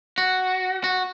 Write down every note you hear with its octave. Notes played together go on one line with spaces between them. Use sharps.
F#4
F#4